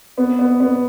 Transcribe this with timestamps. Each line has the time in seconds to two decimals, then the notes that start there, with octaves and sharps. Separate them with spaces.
0.18 B3
0.39 B3
0.60 B3